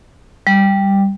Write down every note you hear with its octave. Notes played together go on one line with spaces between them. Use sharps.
G3